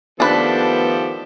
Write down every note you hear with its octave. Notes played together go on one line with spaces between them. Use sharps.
D#3 F3 A3 B3 D4 G4 A4 B4